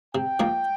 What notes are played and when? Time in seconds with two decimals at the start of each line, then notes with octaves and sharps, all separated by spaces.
0.15 C3 G5
0.40 F3 A#3 D#4